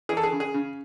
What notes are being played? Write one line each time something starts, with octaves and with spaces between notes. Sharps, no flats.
E3 G#4
A4
G#4
C#3
G#4
C#3